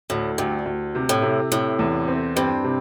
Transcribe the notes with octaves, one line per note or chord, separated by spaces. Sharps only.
D2 A2
D2 G2
D2
C3
A2
C3
A2 C3
E2
C4
G2 C4
C3